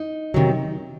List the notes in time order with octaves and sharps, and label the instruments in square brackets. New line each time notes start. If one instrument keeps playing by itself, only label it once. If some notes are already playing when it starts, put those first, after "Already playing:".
Already playing: [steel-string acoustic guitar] D#4
C3 D#3 F#3